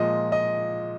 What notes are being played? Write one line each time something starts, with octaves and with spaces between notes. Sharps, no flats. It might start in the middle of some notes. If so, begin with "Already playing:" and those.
Already playing: A#2 F3 G#3 D#5
D#5